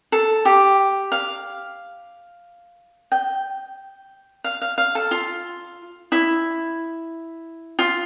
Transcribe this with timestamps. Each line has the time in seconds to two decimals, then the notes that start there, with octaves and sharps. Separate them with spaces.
0.12 A4
0.45 G4
1.12 F5
3.12 G5
4.44 F5
4.62 F5
4.78 F5
4.95 A4
5.11 F4
6.12 E4
7.79 F4